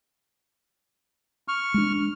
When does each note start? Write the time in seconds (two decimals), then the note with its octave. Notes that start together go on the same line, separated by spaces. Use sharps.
1.48 C#6 F6
1.74 G#3 D4